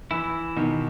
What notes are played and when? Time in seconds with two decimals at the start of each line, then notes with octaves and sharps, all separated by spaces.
0.11 E3 E4
0.56 B2 D#3